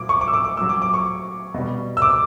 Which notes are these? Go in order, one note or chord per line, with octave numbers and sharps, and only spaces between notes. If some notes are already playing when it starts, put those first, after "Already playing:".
Already playing: A#2 F#3 D6
C#6
D6
E6
D6
D6
A#2 F#3 E6
D6
D6
C#6
B2 G3
E6
D6